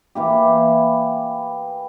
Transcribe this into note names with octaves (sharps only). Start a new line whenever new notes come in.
E3 A#3 G4